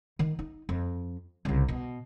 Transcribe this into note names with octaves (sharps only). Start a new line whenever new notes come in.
D#3
D#4
F2
C2 C#3
B2